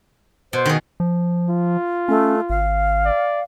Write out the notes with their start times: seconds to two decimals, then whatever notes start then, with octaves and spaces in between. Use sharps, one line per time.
0.53 B2 C5
0.66 D#3 G#4
1.00 F3
1.50 F4
2.09 A3 C#4
2.50 G#1 F5
3.05 D5